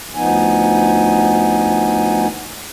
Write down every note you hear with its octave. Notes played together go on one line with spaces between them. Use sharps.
D2 F3 B3 D#4 G#5